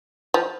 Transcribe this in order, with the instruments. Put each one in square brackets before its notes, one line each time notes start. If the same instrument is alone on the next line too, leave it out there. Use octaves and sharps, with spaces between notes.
[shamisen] F3